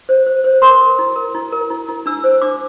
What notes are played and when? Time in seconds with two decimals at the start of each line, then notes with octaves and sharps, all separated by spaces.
0.09 C5
0.27 C5
0.44 C5
0.62 A#4 C6
0.81 A#4
0.99 E4
1.16 A#4
1.35 E4
1.52 A#4
1.70 E4
1.88 E4
2.06 D4 E6
2.24 C5
2.42 D4 D6